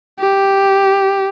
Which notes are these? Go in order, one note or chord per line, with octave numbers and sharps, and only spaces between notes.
G4